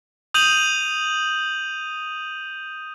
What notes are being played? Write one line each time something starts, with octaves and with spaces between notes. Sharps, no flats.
D#6 G6 D#7 F7 F#7